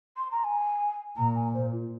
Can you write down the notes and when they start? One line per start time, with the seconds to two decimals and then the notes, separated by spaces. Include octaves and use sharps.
0.17 C6
0.31 A#5
0.44 G#5
1.17 A#2 A#5
1.35 G#5
1.53 C5
1.72 F4